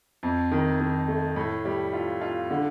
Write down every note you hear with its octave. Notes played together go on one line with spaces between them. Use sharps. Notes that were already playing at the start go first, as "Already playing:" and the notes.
F2
D#3
D#3
A3
A2
G3
F4
F4
D3